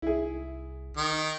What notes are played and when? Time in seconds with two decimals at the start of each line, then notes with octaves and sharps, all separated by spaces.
0.02 C2 E4 G#4
0.97 D#3